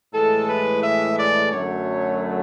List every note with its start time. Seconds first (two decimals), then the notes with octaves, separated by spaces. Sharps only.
0.13 A2 E3 G#3 A4
0.48 B4
0.83 E5
1.17 D5
1.51 F#2 D3 F#3 A3 C#5